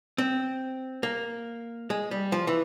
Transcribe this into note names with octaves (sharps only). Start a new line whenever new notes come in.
C4
A#3
G#3
G3
F3
E3